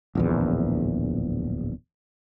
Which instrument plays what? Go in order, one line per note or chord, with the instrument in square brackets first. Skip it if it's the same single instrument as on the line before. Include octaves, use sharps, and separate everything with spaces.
[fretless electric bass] D1 A#1 E2